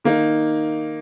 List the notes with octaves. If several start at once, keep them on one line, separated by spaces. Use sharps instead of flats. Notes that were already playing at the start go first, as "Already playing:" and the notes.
D#3 A#3 D#4